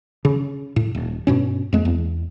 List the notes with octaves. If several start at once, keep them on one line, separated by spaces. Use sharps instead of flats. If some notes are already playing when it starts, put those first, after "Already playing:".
C#3
A2
D#1
G2 B2 C#4
F2 G#3 A#3
E2